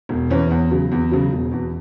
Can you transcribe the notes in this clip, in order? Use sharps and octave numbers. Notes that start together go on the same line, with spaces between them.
E1
E2 E3 C#4
E2
C#3 F#3
E2
C#3 F#3
E1
E2 B2